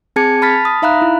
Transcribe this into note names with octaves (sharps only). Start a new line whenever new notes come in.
C4 G#4 A5 G#6 C#7
A5 B5 F6 A6 B6
D#6
D#4 E5 F5 A#5 B5 F#6
E4